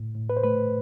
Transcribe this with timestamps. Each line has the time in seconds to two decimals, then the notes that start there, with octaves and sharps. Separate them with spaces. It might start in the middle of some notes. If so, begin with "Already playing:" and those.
Already playing: A2
0.15 A2
0.30 B4
0.37 C5
0.43 A3 B4